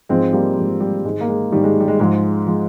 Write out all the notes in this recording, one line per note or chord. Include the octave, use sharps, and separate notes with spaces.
G#2 F3 G#3 C4
G3 A#3
G#2 F3 G#3
G3
G#2 D#3 G#3
A#3
G#3
G#2 D#3 G3
G#3
G3
G#3
G#2 F3 G#3
F3 G#3